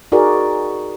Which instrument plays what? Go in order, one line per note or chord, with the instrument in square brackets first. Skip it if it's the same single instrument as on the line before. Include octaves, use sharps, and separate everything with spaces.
[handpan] D#4 F#4 G#4 A#4 D5